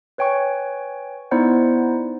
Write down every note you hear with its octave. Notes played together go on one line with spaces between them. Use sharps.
B4 C#5 G5 G#5 C#6
B3 D#4 E4 C5 D5 F#5